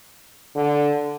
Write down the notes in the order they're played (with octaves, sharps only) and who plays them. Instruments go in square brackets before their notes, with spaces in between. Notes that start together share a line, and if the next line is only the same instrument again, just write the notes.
[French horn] D3